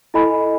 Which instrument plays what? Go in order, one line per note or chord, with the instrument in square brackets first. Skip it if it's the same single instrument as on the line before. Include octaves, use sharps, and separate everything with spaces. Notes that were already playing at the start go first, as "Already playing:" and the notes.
[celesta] E4 A4 D#5 G#5 B5